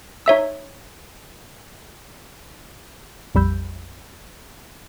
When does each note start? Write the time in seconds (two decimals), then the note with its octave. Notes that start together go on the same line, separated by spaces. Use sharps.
0.26 D#4 C#5 E5 E6
3.35 A#1 F2 G3 B5 E6 G6